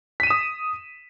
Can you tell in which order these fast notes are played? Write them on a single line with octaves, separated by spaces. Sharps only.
B6 D#7 E7 D#6